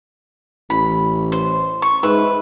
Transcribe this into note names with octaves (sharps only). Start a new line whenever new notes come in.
A1 B5
C5
C#6
G#2 B4 E5